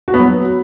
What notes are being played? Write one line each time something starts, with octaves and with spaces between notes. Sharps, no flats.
F#4
B3
F#3